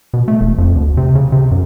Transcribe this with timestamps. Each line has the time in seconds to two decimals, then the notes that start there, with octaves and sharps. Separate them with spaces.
0.13 B2
0.28 A3
0.41 E1
0.58 F2
0.75 D2
0.97 C3
1.15 C#3
1.32 C3
1.51 F#2